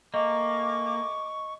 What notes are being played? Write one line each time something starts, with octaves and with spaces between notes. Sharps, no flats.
A3 A#3 D#5 G#5 C#6 D6